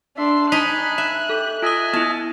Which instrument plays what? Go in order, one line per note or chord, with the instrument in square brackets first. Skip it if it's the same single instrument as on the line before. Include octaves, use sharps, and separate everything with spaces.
[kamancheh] D4 C6 [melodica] E5
[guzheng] D#4 [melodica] G#5 B5 [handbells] A5 B6 [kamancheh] F#6
[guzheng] E5
[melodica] G4 [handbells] A4
[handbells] F4 D#6 [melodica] D#5 E5 G#5
[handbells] B3 E4 [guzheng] A5